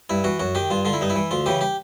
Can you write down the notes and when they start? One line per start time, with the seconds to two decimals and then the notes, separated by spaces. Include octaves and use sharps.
0.10 G2 E4
0.24 E3 F#4
0.39 F#2 F#4
0.55 D#3 G4
0.70 G2 F4
0.85 D3 F4
0.93 E4
1.01 G2 D#4
1.10 E4
1.16 E3
1.31 D2 F4
1.46 C#3 E3 G4
1.61 G4